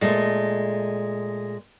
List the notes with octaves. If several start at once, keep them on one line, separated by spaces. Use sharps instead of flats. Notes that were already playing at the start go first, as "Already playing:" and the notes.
A#2 G#3 A3